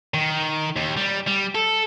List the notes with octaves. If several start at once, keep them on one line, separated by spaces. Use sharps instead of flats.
D#3
D#2
G3
G3
A4